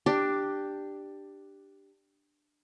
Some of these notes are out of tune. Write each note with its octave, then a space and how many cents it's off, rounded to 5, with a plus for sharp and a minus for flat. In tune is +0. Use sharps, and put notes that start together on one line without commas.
D4 +10 G4 +0